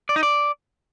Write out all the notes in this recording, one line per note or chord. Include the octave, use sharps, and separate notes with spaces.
D5
D#4
D5